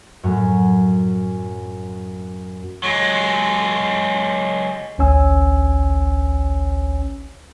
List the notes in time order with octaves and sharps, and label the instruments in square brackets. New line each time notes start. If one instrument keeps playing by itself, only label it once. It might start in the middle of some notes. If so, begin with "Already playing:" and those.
[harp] F#2 A2
[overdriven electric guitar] F#3 G#3
[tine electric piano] A1 D2 C#4 C#5 G#5 E6